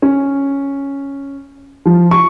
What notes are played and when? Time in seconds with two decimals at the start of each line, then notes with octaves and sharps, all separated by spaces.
0.02 C#4
1.86 F3
2.11 C#6